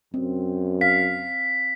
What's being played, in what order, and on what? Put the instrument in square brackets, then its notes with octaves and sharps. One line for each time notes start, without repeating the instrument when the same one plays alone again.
[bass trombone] F#2 [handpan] C4
[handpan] F5 [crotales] B6